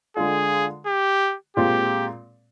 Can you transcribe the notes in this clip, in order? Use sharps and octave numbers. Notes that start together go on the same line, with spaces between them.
D3 G#3 D4 F4 G#4
G4
A#2 G#3 C4 F4 G4